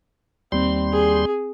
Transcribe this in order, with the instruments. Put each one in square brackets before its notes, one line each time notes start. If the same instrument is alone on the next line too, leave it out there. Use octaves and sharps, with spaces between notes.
[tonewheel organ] D#2 G3 C6 [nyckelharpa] C4
[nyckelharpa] G#4